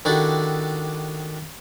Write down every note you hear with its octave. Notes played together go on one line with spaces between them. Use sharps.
D#3 D4 E4 F#4 G4 A4